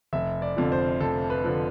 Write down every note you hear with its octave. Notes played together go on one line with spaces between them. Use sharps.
F1 E5
D5
F2 D3 F3
C5
F1 A4
B4
D3 F3